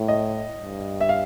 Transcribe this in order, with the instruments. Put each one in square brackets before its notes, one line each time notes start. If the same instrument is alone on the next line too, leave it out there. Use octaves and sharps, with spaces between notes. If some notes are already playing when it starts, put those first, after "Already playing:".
Already playing: [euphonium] A2
[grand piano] D#5
[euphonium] G2
[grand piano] E5
F5